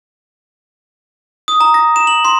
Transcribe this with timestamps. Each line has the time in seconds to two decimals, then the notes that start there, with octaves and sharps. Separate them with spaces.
1.48 D#6
1.60 A#5
1.74 A#6
1.96 E7
2.07 F#7
2.25 C6